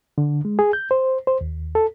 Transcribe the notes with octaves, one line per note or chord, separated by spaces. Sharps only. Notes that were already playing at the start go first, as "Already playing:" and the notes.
D3
G#3
G#4
G6
C5
C5
D#2
A4